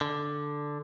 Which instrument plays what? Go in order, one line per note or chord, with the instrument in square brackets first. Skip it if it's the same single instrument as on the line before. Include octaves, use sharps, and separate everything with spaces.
[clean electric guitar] D3